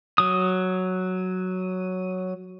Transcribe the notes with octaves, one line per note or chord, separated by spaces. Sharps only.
F#3 D#6